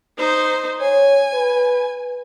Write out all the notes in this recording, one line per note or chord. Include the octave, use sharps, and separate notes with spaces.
D#4 C5
C#5 G#5
B4